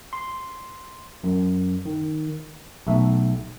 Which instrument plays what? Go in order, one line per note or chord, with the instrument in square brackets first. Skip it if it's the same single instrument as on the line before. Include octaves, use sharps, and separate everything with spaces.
[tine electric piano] C6
F#2
D#3
[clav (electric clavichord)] B1 A3 E5